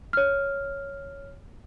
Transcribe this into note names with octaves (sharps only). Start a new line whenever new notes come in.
C#5 F6